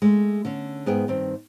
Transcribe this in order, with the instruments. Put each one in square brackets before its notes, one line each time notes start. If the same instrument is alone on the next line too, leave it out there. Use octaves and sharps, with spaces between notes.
[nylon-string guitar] G#3 A3
D3 C#4
G#2 B3 G#4 E5 G5
G2 D#3 C4